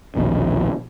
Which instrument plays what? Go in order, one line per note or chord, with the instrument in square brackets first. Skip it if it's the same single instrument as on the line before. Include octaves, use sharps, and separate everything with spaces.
[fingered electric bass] A#1 D#2 B2